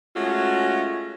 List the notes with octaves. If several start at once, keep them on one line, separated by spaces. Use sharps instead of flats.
G#3 A3 C#4 F4 F#4